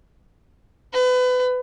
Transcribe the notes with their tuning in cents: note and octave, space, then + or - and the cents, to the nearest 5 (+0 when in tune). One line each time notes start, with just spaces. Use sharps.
B4 +30